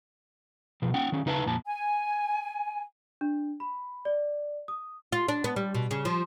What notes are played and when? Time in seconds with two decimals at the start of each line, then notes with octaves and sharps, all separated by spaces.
0.82 B2 F3
0.94 C#4 F#5 G5
1.12 D#3 C#4
1.26 C#3 D#4 B4 D5 A5
1.46 F2 A#2 A#3 A5
1.65 G#5
3.21 D4
3.60 B5
4.05 D5
4.68 D#6
5.12 F4
5.29 D4
5.44 B3
5.56 G3
5.75 B2
5.91 C#3
6.05 F3